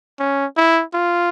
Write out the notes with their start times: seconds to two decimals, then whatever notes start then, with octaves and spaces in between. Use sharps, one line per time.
0.19 C#4
0.57 E4
0.94 F4